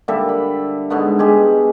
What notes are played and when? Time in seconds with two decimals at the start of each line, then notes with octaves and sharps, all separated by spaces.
0.08 A#2 D3 G3 E5
0.29 B5
0.90 G#2 B2 D3 B3
1.19 G#3 G4 G#4